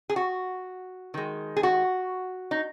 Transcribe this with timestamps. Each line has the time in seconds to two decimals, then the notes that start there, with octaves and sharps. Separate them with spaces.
0.10 G#4
0.16 F#4
1.14 D#3 G#3
1.56 G#4
1.63 F#4
2.51 D#4